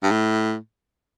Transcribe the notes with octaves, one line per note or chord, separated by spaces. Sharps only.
G2
A2